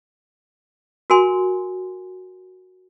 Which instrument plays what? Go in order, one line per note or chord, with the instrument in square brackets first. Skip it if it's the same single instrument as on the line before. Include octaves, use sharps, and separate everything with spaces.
[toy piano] F#4 A#4 G#5 C6